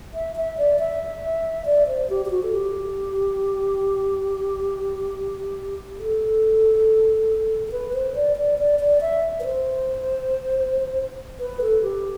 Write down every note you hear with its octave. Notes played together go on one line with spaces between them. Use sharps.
E5
E5
D5
E5
D5
C5
G4
G4
F#4
A4
G4
A4
A4
B4
C5
D5
D5
D5
D5
E5
B4
C5
B4
A4
G4